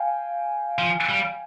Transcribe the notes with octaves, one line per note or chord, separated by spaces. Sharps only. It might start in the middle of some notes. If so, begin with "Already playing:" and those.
Already playing: F5 G5 G#5
F3
G3